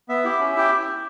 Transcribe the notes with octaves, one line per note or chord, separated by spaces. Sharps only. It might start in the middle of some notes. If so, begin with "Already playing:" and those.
B3 E5
E4 G4
C#4
E4 G4 G5